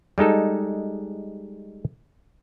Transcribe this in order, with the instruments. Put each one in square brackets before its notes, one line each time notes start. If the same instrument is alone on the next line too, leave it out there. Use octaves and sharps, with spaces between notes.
[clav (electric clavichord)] G3 G#3 D#4 A4